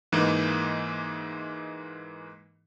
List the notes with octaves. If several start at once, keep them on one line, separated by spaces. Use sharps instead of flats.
G#2 E3 G#3 A#3 D#4